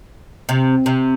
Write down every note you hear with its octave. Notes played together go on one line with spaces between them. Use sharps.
C3
C3